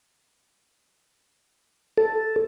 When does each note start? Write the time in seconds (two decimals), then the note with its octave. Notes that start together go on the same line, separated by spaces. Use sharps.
1.98 A4